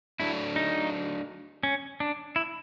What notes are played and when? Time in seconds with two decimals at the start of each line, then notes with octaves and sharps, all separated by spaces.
0.20 F#3 A3 D4 E4
0.56 D#4
1.63 C#4
2.00 D4
2.36 E4